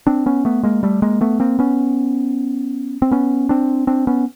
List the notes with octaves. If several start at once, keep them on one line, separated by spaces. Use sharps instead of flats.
C4 D4
B3 C#4
A3 B3
G#3 A#3
G3 A3
G#3 A#3
A3 B3
A#3 C4
B3 C#4
C4
B3 C#4
C4 D4
C4 D4
B3 C#4